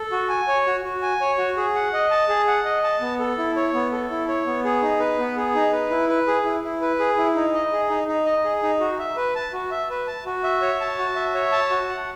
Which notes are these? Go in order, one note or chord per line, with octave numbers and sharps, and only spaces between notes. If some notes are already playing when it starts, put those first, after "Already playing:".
Already playing: A4
F#4
G#5
C#5
F#4
F#4
G#5
C#5
F#4
G#4
F#5
D#5
A5
G#4
F#5
D#5
A5
B3
A4
E4
C#5
B3
A4
E4
C#5
B3
G#4
D#4
B4
B3
G#4
D#4
B4
E4
B4
G#4
E4
E4
B4
G#4
E4
D#4
D#5
G#4
D#4
D#4
D#5
G#4
D#4
F#4
E5
B4
A5
F#4
E5
B4
A5
F#4
E5
C#5
A5
F#4
E5
C#5
A5
F#4
F#5